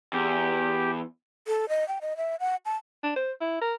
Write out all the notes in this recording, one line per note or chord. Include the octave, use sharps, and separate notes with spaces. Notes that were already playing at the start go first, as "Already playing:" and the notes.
E2 G4
A4
D#5
G5
D#5
E5
F#5
A5
D4
C5
E4
A#4